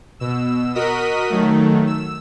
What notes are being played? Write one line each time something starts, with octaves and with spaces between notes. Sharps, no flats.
B2 E6
F#4 A#4 D#5 D#6 B6
D#3 F#3 A3
E6